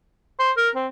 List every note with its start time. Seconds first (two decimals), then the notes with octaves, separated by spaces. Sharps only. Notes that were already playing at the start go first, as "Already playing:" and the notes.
0.39 C5
0.57 A#4
0.75 C4